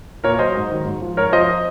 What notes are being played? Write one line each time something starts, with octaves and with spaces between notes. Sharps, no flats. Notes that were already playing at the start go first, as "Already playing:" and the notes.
A#2 A#4 C#5
F#3 C5 D#5
G#2
D#3 F#3
G#2
F3
G#2 A#4 C#5
F3 C5 D#5